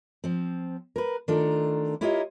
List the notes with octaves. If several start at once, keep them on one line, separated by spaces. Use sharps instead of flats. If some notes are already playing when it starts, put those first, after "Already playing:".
F3 C4
A#4 B4
D#3 A3 D4 F4 A4 A#4
E4 F4 G4 A#4 C#5 D#5